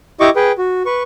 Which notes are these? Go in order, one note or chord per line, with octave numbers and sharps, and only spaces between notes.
E4 G4 D#5 C#6 D6
G#4 B4 G5
F#4
B4 C#6